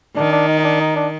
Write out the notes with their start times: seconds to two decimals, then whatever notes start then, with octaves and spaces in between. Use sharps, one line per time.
0.16 D#3 D4
0.32 D4
0.48 D#4
0.59 D#4
0.65 D4
0.81 D#4
0.96 D4